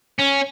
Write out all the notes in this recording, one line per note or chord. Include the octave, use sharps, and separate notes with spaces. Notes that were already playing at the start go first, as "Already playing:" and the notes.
C#4